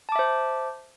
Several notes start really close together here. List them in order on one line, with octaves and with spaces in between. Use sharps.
A5 D6 E5 C5